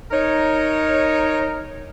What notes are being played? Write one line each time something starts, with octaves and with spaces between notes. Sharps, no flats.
D#4 A#4 C#5